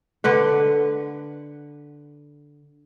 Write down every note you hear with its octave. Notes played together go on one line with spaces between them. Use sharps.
D3 B4 F#5